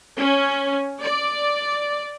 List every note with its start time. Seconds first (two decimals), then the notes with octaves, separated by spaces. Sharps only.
0.18 C#4
1.02 D5